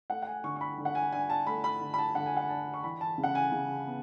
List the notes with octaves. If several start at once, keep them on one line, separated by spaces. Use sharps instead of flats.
A3 F#5
F#5
G#5
D3 C#6
C#6
B5
D3
F#5
G#5
D4 G#5
A5
A3 B5
B5
D3
B5
A5
D3 F#5
G#5
F#5
D4 A5
C#6
E3 B5
A5
C#3
F#5
G#5
C#3
B3